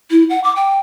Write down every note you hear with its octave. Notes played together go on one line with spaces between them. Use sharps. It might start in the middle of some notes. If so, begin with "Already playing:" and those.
E4
F#5
D6
G5